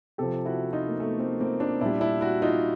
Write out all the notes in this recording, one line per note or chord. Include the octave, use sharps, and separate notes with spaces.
C3 F3 G4 A4
E4 F#4
D#4 F4
A#3
A3 B3
A#3 C4
A#3 C4
C4 D4
A#2 G3 D4 E4
D4 E4
E4 F#4
D#4 F4